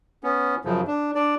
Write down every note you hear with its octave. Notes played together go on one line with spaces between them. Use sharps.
B3 C#4
F#2 C#3 F3
D4
D4 D5